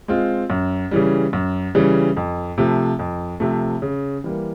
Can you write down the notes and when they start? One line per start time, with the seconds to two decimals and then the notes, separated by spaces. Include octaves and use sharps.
0.08 G#3 C4 F4
0.50 F#2
0.91 C#3 E3 G3
1.33 F#2
1.75 C#3 E3 G3
2.17 F2
2.58 C3 F3 A3
2.99 F2
3.40 C3 F3 A3
3.82 C#3
4.24 E3 G3 A#3